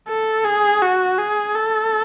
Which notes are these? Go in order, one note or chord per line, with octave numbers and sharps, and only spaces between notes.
A4
G#4
F#4
G#4
A4